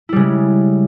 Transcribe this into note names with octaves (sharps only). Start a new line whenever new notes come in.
C#3 G3 G#3 E4